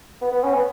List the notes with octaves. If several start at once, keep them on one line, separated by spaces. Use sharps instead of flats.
B3
B3
C#4
B3